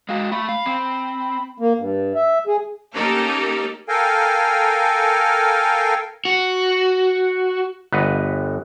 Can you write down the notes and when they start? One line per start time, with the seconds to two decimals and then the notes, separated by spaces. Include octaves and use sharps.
0.09 G#3 F#4 F5
0.32 A3 B5
0.49 F5
0.66 C4
1.60 A#3
1.79 G2
2.15 E5
2.47 G#4
2.95 A#3 C#4 D#4 G4 A4 A#4
3.89 A4 A#4 F5 G5 G#5
6.25 F#4
7.92 G1 B4 D#5 F#5